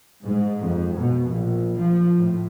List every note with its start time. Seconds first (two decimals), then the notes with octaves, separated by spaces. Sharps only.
0.25 G#2
0.60 F2
1.00 B2
1.30 A#1
1.80 F3
2.18 A2